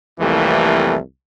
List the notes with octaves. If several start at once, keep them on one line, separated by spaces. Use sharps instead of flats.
C2 F2 E3 A3 A#3 G4